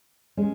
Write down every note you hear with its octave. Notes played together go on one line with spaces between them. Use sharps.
G#3 C#4